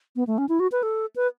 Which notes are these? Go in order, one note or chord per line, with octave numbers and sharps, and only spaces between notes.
B3
A3
C#4
E4
F#4
B4
A4
B4